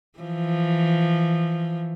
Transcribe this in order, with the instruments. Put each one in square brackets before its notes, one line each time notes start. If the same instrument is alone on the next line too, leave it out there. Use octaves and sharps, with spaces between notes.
[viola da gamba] E3 F3